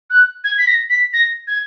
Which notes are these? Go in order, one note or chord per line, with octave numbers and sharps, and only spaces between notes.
F#6
G#6
B6
A#6
B6
A#6
G#6